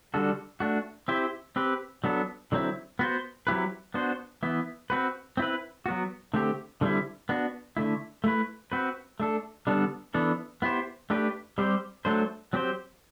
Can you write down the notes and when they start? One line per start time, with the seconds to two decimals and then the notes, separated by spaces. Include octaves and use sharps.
0.14 D3 G3 D4 F#4 A4
0.60 A3 D4 F#4
1.08 C4 E4 G4 C5
1.56 C4 G4 B4
2.04 F#3 B3 D4 A4
2.52 D3 F#3 C4 E4
2.99 B3 F#4 C5
3.47 F#3 C4 E4 G4 B4
3.94 B3 D4 F#4 C5
4.43 E3 B3 E4
4.90 C4 F#4 B4
5.37 C4 E4 B4
5.86 F#3 B3 F#4
6.34 D3 A3 C4 G4
6.81 D3 G3 C4 E4
7.29 B3 D4 F#4
7.77 D3 A3 E4
8.24 A3 E4 B4
8.72 C4 F#4 B4
9.20 A3 D4 A4
9.67 D3 G3 B3 D4 A4
10.14 E3 B3 D4 A4
10.62 B3 E4 G4 C5
11.10 A3 D4 G4 B4
11.58 G3 C4 G4 C5
12.05 F#3 A3 D4 A4 C5
12.53 F#3 C4 G4 C5